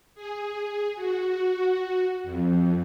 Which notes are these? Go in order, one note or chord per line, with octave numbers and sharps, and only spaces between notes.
G#4
F#4
F2